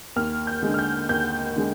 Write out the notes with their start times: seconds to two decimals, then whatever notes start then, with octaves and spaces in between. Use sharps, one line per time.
0.16 D#2 F6
0.47 G6
0.63 D3 G#3
0.74 F6
0.79 G6
1.09 D#2 G6
1.56 D3 G#3